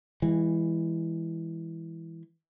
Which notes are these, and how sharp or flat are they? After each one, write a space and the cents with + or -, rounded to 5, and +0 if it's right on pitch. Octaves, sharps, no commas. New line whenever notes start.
E3 +0 G#3 -25